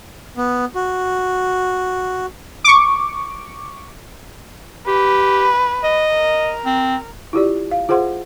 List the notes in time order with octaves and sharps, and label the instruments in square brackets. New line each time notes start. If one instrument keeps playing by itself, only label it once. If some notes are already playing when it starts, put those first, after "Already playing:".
[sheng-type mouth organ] B3
F#4
[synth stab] C#6 D6
[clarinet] G4 [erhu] B4
[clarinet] D#5
[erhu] A#4
[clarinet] C4
[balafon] E4 F4 G4 D5
F5
F4 G#4 C5 F#5 C6